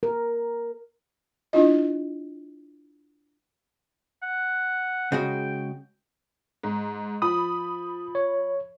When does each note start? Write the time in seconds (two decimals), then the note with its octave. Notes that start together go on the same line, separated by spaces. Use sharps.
0.03 A#4
1.53 D4 E4 F4 D#5
4.23 F#5
5.12 C#3 G#3 F#4 G5
6.63 G#2
7.22 F3 B5 D#6
8.15 C#5